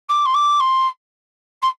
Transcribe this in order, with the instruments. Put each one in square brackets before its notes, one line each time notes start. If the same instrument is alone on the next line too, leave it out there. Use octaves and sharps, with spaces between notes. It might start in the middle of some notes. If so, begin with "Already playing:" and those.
[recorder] D6
C6
D6
C6
C6